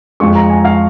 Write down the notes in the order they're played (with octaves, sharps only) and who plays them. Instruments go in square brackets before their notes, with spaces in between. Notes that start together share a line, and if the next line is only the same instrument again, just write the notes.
[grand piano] F2 F3 G#3 C#6
A#5
G#5
F5